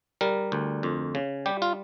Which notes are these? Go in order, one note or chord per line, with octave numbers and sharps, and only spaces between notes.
G3 A#4
D2
F2
C#3
G3 G4
F4